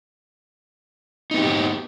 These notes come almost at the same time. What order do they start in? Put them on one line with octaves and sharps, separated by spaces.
D#4 B3 G4